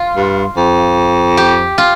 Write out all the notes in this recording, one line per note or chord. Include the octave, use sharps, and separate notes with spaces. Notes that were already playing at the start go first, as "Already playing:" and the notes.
Already playing: F4
G2
F2
G4
F4